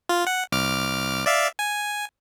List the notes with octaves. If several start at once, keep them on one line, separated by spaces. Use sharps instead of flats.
F4
F#5
C2 D6 F6
D5 E5 F5
G#5